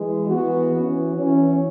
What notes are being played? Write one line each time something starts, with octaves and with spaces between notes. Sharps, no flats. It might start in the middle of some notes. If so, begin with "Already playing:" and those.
Already playing: E3 G#3
E3 B3 F#4
E3 C#4
E3 C#4